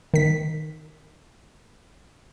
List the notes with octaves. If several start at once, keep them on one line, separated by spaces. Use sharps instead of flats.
D#3 B6